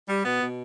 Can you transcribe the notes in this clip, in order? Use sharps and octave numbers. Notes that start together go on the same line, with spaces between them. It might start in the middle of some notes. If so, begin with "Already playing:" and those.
G3
B2 B3
B2